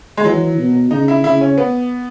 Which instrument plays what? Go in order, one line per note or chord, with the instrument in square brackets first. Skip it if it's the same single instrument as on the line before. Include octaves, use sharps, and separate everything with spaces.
[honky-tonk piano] G#3
[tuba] E3 [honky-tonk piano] F#3
[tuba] B2
[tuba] C#3 [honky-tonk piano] D#4
[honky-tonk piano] E4
[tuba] C#3 [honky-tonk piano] E4
[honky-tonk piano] C#4
B3